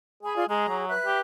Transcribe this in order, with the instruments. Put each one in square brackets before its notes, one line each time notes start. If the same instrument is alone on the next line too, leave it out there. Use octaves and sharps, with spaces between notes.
[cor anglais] G#4 [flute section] G#5 B5
[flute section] F4 D5
[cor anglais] G#3 [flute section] G#4 A#5
[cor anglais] F#3
[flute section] B4 E5 F#6
[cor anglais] G4